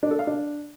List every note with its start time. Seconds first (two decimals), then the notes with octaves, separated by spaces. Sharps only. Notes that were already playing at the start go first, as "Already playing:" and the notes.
0.03 D4
0.11 A4
0.19 F5
0.27 D4